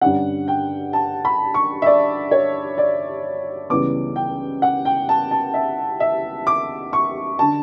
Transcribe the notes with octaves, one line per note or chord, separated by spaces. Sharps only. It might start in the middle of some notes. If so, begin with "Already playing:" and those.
G2 D3 G3 C#4 F#5
G5
A5
B5
C#6
E5
D5
C#5
D5
C#2 C#3 E3 G3 B3 D6
G5
F#5
G5
A5
A5
E5
E5
D6
C#6
D3 A5